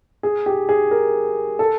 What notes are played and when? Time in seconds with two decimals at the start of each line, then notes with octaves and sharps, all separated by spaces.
0.23 G#4
0.46 G4
0.69 G#4
0.91 A#4
1.59 A4